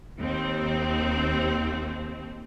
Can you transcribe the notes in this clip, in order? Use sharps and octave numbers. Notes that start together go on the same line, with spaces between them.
D#2 C4